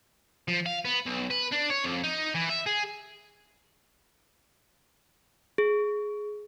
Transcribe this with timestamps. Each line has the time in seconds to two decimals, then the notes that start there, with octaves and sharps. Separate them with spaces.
0.48 F3
0.66 F5
0.85 B3
1.06 B1
1.30 B4
1.52 D4
1.70 C#5
1.84 F2
2.03 D#4
2.35 E3
2.49 E5
2.66 G#4
5.58 G#4